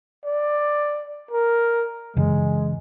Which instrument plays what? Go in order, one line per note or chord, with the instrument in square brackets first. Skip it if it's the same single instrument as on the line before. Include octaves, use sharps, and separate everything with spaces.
[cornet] D5
A#4
[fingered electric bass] F#2 C#3 E3 [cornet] G#3